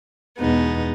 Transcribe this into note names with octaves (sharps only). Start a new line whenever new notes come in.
E2 B2 G#3 B3 D#4